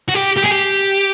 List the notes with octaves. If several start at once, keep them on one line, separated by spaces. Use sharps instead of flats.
F#4
G4
G4
G#4
G4